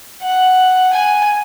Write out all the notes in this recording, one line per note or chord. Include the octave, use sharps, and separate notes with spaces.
F#5
G#5